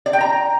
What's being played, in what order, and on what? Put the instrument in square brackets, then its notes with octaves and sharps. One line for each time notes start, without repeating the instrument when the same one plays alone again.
[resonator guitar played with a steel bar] D5
G5
A#5